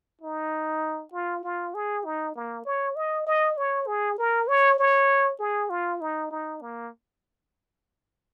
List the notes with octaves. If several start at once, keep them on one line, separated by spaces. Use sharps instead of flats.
D#4
F4
F4
G#4
D#4
A#3
C#5
D#5
D#5
C#5
G#4
A#4
C#5
C#5
G#4
F4
D#4
D#4
A#3